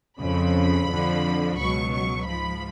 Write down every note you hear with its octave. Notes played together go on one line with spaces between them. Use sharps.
F2 C#3 F3 B5
F2 D3 F3
C#2 B2 F#3 C#6
C#6
G#2 F3 B5